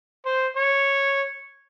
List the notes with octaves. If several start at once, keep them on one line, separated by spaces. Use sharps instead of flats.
C5
C#5